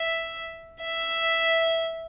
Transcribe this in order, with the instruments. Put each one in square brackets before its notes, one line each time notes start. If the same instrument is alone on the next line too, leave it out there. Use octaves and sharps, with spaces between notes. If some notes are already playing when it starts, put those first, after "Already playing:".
Already playing: [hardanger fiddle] E5
E5